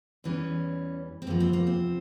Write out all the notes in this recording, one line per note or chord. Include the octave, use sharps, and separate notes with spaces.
E2 E3 G3 C#4
C4
E2 C3 F3 A#3
C4
A#3
C4